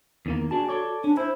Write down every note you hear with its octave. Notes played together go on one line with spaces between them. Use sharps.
E2 D#3 A#3
D4 F#4 G#4 A5
A4 C#5 D5
C#4 D4
E4 C5